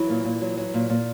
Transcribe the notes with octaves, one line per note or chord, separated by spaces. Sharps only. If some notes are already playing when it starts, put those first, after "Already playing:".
Already playing: E3 F#3 E4
A#2
A#2
F#3
F#3
A#2
A#2